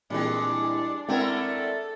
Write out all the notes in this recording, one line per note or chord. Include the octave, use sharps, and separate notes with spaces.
A#2 E3 G3 G#3 C4 D4
G#3 A3 C4 E4 A#4 D5 F#5
A4